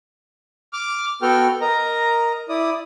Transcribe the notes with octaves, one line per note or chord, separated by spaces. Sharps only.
D6 F6
B3 F#4 A4 G5 F6
A#4 D#5 A#5
E4 D5 D#6